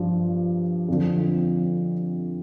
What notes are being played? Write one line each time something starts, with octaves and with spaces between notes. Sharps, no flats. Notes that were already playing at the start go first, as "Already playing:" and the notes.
Already playing: G2 F3
F2 D3 F3